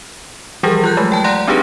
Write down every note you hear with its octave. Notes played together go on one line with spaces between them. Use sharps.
E3 F3 G3 G4 G#4 A#4
F4 F#6 G6
F#3 G#3 A3
G5 A5
D5 F#5 A#5 C6 F#6 A#6
C4 D4 D#4 G4 G#4 B4